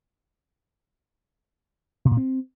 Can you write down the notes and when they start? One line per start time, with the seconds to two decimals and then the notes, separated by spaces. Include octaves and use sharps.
2.05 C3
2.11 A#2
2.17 C4